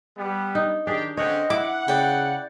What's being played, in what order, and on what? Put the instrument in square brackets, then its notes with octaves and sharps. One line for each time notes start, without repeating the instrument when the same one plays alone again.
[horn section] G3 B3
[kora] D#4
[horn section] D#3 G4 [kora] D4 G#4
[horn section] D3 C4 C#4 [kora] C#5 F#5 G5 [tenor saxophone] D#5
[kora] E4 [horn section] F#5 [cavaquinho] D6
[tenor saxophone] C#3 [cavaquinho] D5 G5